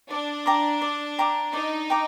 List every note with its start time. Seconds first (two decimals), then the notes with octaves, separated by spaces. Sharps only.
0.10 D4 D5
0.46 G5 A#5 D6
0.82 D5
1.19 G5 A#5 D6
1.53 D#4 D5
1.90 G5 A#5 D6